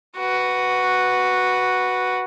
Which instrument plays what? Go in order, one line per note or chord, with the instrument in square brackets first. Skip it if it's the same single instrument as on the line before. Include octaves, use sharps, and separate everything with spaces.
[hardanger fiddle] F#4 B4